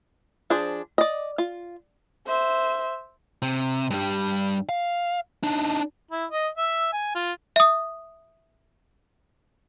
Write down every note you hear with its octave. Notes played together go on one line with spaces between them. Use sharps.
F3 D4 G#4 C5
D5 D#5
F4
C5 E5
C3
G2 G3
F5
D4 D#4
E4
D#5
E5
G#5
F4
E5 D#6